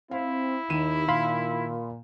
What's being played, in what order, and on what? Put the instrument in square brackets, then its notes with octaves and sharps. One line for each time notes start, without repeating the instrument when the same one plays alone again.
[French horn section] C4 [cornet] E4 [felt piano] F5
[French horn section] D#2 [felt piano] D#3 D#7 E7
[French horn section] A#2 [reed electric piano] F5 B5 C6